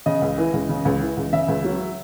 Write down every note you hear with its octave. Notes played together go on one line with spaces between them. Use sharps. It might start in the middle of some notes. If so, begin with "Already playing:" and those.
C#3 D#5
C#2
E3
C#2
C#3
C#2
E3
C#2
C#3 E5
C#2
F#3